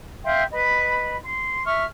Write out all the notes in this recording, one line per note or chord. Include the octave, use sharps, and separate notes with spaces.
E5 F5 G5 C6
B4 D#5 B5
C6
E5 C#6 F6